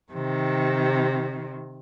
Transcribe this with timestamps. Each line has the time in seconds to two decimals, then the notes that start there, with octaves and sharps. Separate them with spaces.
0.13 C3 D#3